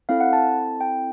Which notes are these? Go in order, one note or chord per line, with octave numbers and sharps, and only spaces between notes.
C4 E4 A4 F5
F#5
A5
G5